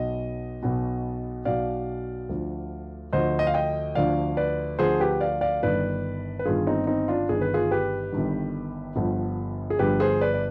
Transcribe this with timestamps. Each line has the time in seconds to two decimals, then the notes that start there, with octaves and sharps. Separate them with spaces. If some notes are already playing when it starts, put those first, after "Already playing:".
Already playing: B1 B2 D#5
0.63 B1 B2
1.45 B1 B2 D5 F5
2.29 D2 D3 F3
3.13 D2 D3 F3 C5 D#5
3.39 D#5
3.47 F5
3.54 D#5 G5
3.95 D2 D3 F3 D5 F5
4.37 B4 D5
4.79 D2 D3 F3 G#4 C5
5.00 G4 B4
5.20 D5 F5
5.41 D5 F5
5.63 G1 G2 D#3 B4 D5
6.39 B4
6.45 G1 G2 D#3 F4 G#4
6.67 C4 D#4
6.87 C4 D#4
7.08 D4 F4
7.29 G1 G2 D#3 G#4
7.41 B4
7.54 F4 G#4
7.71 G4 B4
8.12 G1 G2 D#3
8.96 G1 G2 D3 F3
9.70 G#4
9.79 G1 G2 D3 F3 G4 B4
10.00 G#4 C5
10.21 B4 D5
10.34 D5